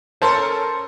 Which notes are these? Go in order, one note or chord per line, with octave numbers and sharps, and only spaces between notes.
C#4 A4 A#4 C5 A5